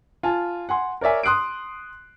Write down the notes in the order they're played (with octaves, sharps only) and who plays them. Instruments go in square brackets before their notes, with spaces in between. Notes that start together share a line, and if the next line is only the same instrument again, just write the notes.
[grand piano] F4 G#5 A5
F#5 G#5 C6
A#4 C#5 D5 E5 G#5
C6 D#6 F#6 C7 D7